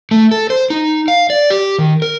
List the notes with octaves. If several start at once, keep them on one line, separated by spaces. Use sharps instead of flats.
A3
A4
C5
D#4
F5
D5
G4
D#3
A#4